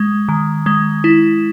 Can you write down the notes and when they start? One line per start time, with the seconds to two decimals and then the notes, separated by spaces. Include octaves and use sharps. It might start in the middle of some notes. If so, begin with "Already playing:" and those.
Already playing: G#3
0.28 D#3
0.66 G#3
1.04 E4